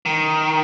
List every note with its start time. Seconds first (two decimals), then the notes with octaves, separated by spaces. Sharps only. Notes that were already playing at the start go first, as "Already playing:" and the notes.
0.06 D#3